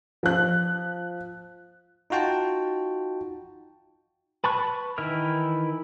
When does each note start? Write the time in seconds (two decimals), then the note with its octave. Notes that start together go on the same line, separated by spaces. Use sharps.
0.23 F3 F#6
2.10 D#4 F4 F#4 G5 A5
4.44 B4 A5 B5 C#6 F#6
4.98 D#3 E3 E4 A#4 F6